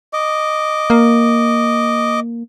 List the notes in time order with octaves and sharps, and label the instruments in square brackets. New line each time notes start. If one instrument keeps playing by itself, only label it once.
[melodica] D#5 D6
[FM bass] A#3